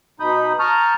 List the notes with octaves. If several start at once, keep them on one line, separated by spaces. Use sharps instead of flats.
B2 D#4 B5 D#6 G6
A5 A#5 C#6 D#6 F6 G6